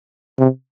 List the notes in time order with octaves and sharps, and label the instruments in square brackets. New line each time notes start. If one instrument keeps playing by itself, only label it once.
[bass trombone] C3